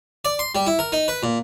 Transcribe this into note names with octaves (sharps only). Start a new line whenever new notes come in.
D5
C6
G3
E4
A#4
D#4
B4
A#2